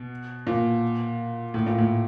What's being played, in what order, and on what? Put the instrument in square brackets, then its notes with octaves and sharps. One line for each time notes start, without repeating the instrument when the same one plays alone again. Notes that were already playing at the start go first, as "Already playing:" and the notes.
Already playing: [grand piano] B2
A#2
A2
A#2
A2